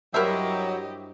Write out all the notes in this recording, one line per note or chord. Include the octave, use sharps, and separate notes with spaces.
G2 F#3 E4 G4 A#4 C5 D#5 E5